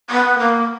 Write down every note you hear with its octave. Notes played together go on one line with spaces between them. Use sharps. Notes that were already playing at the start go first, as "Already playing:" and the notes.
B3
A#3